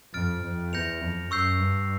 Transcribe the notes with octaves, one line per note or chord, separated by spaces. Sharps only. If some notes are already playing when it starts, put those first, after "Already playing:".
F2 F6 A6 D7
F2
E2 G6 A#6 C#7 F7
F2
F#2 C#6 E6 G6 C7
G2